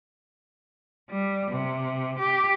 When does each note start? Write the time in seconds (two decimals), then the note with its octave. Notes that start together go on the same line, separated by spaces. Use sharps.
1.10 G3
1.52 C3
2.19 G4